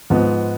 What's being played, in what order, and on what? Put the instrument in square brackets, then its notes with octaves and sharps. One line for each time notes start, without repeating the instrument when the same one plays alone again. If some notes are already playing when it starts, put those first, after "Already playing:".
[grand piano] G#2 F3 B3